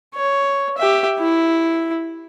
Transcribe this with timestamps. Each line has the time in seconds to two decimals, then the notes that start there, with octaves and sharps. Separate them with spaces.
0.15 C#5
0.78 G4 E5
1.19 E4